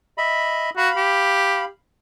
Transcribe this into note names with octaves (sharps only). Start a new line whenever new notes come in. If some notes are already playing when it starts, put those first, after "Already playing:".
D#5 E5 B5
F#4 F5 B5
G4